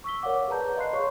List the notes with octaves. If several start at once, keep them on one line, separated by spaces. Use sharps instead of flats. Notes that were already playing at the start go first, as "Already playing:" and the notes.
C#6 E6 B6 G7
A#4 C#5 D5 F5 F#5 D6
G#4 B4 D5 A5 A#5 G6
D#5 F5 B5 C6 F#6 C7
G#4 C#5 C6 C#6